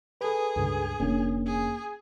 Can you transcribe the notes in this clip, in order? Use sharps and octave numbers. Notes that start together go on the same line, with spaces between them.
G#4 A4 B4
C#2 G2 C#3
F1 D3 A#3 C#4 D4
G#4